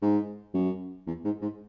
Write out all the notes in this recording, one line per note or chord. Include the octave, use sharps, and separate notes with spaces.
G#2
F#2
E2
G#2
G#2